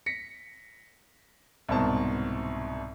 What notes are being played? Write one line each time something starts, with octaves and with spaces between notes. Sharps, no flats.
A#6 B6 C#7
C2 G#2 B2 A#4 C5 A5